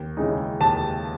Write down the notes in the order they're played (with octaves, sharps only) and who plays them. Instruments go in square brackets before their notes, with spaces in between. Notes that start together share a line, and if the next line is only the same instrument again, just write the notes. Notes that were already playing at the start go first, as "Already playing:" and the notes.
Already playing: [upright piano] D#2
C#3 E3 G#3 D#4
D#2 A5